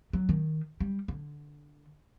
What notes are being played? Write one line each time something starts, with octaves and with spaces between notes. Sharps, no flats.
F#3
D#3
G3
D3